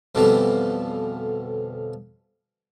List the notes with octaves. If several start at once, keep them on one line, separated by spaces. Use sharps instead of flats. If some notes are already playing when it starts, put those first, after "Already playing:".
F2 B2 D3 E3 F3 G3